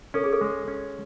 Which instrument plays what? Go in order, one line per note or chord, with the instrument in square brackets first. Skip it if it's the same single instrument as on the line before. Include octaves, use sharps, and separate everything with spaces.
[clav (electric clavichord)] C#4 [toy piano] A4
[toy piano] G#4
A4
[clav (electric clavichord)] G#3
C#4